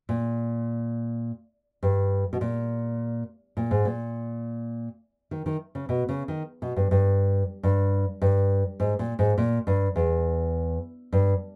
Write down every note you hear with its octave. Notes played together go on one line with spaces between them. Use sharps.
A#2
G2
B2
A#2
A#2
G#2
A#2
D#3
D#3
C#3
B2
C#3
D#3
B2
G2
G2
G2
G2
G#2
A#2
G#2
A#2
G2
E2
G2